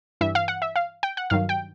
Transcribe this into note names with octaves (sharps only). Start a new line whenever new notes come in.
G2 E3 E5
F5
F#5
E5
F5
G5
F#5
G2 D#3 F#3 F5
G5